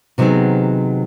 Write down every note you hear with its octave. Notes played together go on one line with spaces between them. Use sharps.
C3 D#3 F#3 B3 C4 G#4